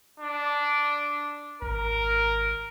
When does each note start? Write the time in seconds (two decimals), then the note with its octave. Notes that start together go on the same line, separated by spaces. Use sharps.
0.20 D4
1.62 G#1 A#4